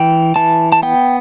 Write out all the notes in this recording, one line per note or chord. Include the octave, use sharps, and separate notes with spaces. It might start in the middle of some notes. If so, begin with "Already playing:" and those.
Already playing: E3 G5
E3 A5
A5
B3 G5